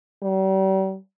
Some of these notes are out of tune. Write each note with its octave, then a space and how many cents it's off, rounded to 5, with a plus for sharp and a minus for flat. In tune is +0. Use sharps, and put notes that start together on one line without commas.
G3 -40